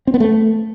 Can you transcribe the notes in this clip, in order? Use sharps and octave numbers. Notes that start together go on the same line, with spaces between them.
C4
B3
A3